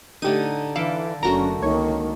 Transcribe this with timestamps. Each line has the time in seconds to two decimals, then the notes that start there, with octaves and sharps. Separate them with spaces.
0.22 A2 D3 D#4 G4 D#7
0.76 D3 E3 A4 F5 B5 D6
1.23 F#1 D3 A3 C#4 F#4 A#4 A#5 A#6
1.62 C#2 D#3 A#3 C#5 C#6